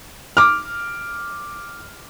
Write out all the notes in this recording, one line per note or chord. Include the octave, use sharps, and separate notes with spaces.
D6 F6